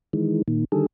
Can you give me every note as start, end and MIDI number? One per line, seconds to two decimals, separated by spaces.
0.13 0.42 51
0.13 0.42 52
0.13 0.42 56
0.48 0.65 46
0.48 0.65 51
0.72 0.86 50
0.72 0.86 51
0.72 0.86 55
0.72 0.86 68
0.72 0.86 69